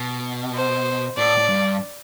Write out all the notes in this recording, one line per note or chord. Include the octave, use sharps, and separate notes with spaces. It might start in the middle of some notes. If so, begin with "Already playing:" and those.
Already playing: B2
C5
A2 D5
A2
G2